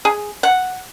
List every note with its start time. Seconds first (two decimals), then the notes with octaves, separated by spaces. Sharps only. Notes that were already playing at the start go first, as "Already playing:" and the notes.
0.05 G#4
0.43 F#5